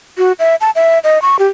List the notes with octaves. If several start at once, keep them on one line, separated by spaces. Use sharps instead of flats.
F#4
E5
A5
E5
D#5
C#6
G4